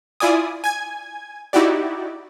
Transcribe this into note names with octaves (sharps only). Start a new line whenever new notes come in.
E4 F4 D5 G#5 D#6
G#5 G#6
D#4 E4 F#4 G4 D5